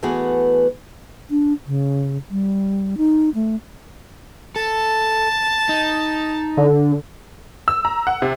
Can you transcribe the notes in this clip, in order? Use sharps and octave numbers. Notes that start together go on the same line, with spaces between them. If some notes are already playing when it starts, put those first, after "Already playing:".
E3 A3 B3 F#4 G#4 B4
D4
C#3
G3
D#4
A3
A4 A5
D#4
D3
E6
A#5
F#5
C3